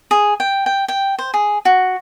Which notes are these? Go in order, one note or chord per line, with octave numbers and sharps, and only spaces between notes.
G#4
G5
G5
G5
C5
G#4
F#4